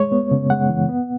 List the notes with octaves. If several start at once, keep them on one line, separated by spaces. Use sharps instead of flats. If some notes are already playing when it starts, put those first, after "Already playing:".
Already playing: G#3 C#5
B3
C#3
G#3 F#5
E3
B3